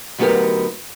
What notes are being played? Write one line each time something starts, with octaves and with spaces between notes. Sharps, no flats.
D2 F#3 B3 D#4 G4 A#4